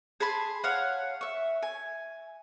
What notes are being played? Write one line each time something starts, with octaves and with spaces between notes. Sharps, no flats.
G#4 A5 B5 C6
C#5 F5 F#5
E5 C#6
G#5